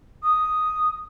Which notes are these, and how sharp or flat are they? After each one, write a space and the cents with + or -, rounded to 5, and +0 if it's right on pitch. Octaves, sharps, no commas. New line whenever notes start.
D#6 +0